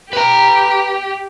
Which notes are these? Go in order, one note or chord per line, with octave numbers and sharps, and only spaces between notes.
G4 B4 A#5